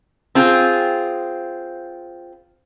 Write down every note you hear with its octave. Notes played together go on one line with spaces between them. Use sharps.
C4 F4 G#4